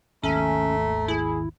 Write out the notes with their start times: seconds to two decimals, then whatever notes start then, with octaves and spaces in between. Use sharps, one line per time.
0.23 G#1 D#2 A3 C#4 A#5
1.08 E4 G#4